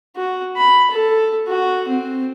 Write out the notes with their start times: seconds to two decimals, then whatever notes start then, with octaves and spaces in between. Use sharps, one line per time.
0.16 F#4
0.57 B5
0.91 A4
1.48 F#4
1.88 C4